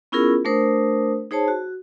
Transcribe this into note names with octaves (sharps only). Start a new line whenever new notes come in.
B3 C#4 E4 F4 G#4 A#4
A3 D4 A#4 C5 D#6
D#4 G#4 C5 C#5 A5
F#4